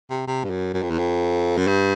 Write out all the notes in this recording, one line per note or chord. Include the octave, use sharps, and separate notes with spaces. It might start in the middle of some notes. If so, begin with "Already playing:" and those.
C3
C3
G2
F#2
F#2
F2
E2
F2
F#2
G2